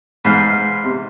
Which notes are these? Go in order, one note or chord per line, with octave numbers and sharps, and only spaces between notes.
G#2 B4 C5 F5
C3